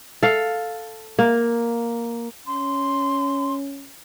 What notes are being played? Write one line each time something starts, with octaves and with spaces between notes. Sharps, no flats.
A4 F5
A#3
C#4 C6